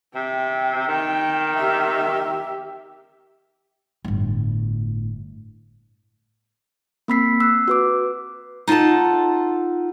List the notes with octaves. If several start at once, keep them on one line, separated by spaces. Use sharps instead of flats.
C3 G5
D#3 G5
G4 E5
G1 A2
A#3 C4 B5 E6 B6 C7
E6 F#6 C7
F#4 B4 D6
D#4 F4 A4 F#5 A5